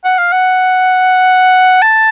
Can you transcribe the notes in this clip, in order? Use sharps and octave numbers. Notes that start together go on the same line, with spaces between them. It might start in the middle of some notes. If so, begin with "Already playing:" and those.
F#5
F5
F#5
A5